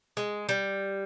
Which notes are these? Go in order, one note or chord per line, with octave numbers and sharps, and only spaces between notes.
G#3
G3